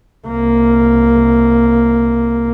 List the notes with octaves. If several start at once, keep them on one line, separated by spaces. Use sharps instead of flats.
C2 A#3